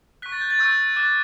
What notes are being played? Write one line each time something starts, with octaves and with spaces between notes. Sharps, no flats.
C#6 F#6 B6
A6
G6
A6
C#6 E6 G6
D6 F#6 A6